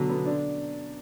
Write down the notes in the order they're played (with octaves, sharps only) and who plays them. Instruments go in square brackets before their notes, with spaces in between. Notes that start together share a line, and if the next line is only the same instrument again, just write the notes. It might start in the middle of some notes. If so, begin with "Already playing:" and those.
Already playing: [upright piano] B2 F#3 [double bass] D3
[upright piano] B3
D4